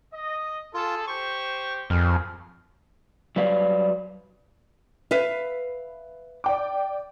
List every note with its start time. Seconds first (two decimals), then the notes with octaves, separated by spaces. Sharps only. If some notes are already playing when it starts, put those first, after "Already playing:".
0.13 D#5
0.74 F4 G#4 A4
1.07 G4 C5 C#6
1.90 F2 G3 C4 G#4 A#4
3.36 F#3 G3 B4 D5 F5
5.11 B4 E5 F5
6.44 D5 G5 D6